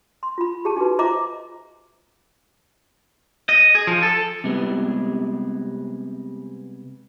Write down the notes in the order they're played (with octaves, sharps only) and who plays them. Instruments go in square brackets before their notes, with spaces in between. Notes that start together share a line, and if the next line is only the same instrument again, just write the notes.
[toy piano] C6
F4 B5
G4 G#4 A5
D#4 F#4 G4 B4
F4 C5 D#5 E5 A#5 D6
[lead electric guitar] D#5
G#4
F3
A4
[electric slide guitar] C3 G3 G#3 B3